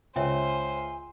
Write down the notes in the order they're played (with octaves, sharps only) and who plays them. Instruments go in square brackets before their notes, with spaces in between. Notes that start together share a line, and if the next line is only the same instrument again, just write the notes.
[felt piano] C#2 [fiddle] C5 [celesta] C#5 E5 G5 [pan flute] G#5